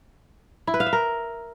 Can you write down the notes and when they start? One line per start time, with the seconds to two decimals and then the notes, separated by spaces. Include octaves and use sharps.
0.67 E4
0.74 B4
0.80 F5
0.86 E5
0.93 A#4